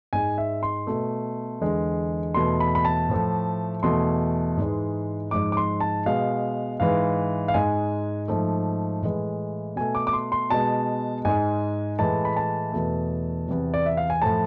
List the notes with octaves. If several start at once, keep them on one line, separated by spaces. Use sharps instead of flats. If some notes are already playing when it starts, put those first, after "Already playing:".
G#2 G#3 G#5
E5
C6
B2 A3
E2 D3 G#3
E2 B2 A3 C6
B5
B5
A5
A2 F3 A3
E2 B2 A3 C6
G#2 E3 G#3
G#2 F3 G#3 D6
D6
C6
A5
B2 G#3 F5
G#2 E3 G#3 F5
F5
G#2 G#3 G#5
G#2 F3 A3
A2 E3 G#3
B2 A3 G#5
D6
D6
C6
C6
B2 G#3 A5
G#2 G#3 G#5
A2 E3 G#3 A5
B5
A5
E2 B2 A3
E2 C3 E3
D5
E5
F5
G#5
A2 F3 A3 A5